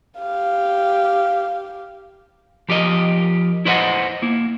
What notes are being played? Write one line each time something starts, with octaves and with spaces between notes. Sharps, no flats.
G4 F5
F3 G4 A#4 D#5
E4 B4 C5 D#5 E5 F#5
A#3 E4